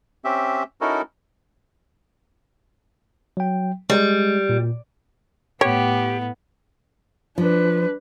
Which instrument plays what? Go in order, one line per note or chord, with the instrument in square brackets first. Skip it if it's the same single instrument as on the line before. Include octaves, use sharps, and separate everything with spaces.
[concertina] C4 C#4 G4 E5
C#4 D#4 E4 F#4 A4 A#4
[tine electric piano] F#3 G5
[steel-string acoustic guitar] G3 [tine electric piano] G#3
[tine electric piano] A#2
[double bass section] A2 [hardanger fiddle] B3 [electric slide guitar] G4 [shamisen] C#5
[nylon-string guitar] F3 [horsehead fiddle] D4 B4